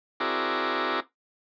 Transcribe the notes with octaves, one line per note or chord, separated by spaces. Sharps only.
C4 E4 F#4 G#4 A#4 D5